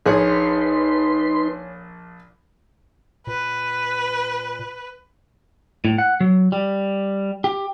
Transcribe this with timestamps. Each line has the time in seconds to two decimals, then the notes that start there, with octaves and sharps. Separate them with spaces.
0.06 A#1 D#4 G#4 B4 C#5 C6
3.27 A#2 B4
5.85 A2
5.98 F#5
6.21 F#3
6.52 G3
7.44 G4